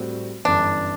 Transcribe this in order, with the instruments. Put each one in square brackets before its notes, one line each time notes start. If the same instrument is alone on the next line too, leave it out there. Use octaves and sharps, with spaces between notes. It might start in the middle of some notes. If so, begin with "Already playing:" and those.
Already playing: [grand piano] A2 G3 C4 F#4 A4
[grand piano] G1 F#2 E3 [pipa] D4